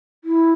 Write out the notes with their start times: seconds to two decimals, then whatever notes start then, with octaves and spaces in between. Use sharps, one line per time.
0.24 E4